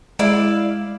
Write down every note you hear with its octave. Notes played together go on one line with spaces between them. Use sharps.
G#3 E4 D5 F5